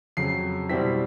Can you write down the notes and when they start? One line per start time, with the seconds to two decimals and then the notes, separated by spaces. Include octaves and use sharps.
0.17 F2 C#3 F#3 C7
0.69 B2 G3 C4 E4 B6